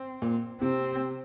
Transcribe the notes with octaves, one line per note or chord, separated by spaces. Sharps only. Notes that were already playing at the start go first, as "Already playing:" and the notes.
Already playing: C4
A#2
C3 C4